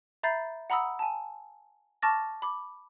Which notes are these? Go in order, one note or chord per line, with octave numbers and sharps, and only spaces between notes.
E5 A#5 B5 G6 A6 C7
F#5 A#5 B5 D#6 E6
G#5 A5
A5 C#6 D6 F6 A6 A#6
B5 D6